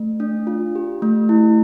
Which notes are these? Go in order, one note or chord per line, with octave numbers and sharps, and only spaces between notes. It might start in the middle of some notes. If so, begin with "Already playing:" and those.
Already playing: A3
D4
F4
G4
A3
E4